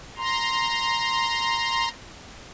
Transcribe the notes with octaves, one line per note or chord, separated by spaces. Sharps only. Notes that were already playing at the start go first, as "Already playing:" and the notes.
A#5 C6